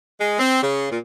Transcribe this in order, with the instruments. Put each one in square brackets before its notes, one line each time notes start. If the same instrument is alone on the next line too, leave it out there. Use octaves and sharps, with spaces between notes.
[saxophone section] G#3
C4
C#3
A#2